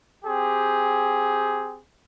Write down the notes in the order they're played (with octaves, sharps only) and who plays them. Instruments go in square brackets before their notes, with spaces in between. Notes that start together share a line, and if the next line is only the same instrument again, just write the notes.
[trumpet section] C4 G4 G#4